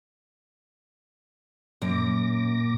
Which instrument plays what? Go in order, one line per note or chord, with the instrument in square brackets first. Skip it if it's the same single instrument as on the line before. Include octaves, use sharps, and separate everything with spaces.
[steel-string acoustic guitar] F#2 [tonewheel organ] A#2 D6 A#6